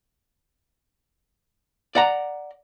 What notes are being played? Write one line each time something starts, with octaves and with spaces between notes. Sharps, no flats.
D5 F#5 A#5